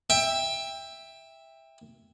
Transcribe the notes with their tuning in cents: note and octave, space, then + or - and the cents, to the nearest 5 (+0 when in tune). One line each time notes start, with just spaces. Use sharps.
E5 +0 G5 +20